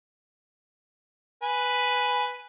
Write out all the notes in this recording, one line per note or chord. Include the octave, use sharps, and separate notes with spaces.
B4 G#5